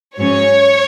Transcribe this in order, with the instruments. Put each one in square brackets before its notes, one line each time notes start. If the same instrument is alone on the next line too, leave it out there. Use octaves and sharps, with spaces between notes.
[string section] G#2 F#3 C#4 C#5